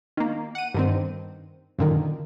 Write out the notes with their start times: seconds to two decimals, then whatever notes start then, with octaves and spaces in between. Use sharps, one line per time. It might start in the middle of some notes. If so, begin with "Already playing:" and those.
0.17 D#3 A#3
0.55 F#5 D#7
0.74 G2 D#3 C4
1.78 F#2 A#2 D3 D#3